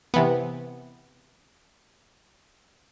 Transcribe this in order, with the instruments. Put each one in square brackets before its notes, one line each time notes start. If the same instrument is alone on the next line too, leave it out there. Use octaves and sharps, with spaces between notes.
[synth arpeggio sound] C3 E3 B3